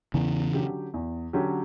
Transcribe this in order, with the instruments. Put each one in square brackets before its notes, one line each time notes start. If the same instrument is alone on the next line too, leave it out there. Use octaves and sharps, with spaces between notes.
[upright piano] E2 [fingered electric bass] C#3 E3
[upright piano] D3 F#3 C#4 G4
E2
D3 F#3 C#4 G4